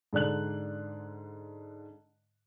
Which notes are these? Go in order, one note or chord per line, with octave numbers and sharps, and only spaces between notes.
G#2 D3 D5 F#6 F#7